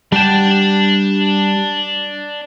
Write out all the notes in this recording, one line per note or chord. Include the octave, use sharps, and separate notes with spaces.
G3 D4 F#5 G5 A5